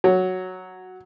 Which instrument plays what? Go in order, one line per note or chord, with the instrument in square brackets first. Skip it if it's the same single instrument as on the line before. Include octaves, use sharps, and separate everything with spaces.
[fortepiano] F#3